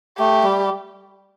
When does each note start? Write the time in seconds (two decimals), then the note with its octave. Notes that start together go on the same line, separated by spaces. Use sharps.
0.18 A3 G4
0.43 G3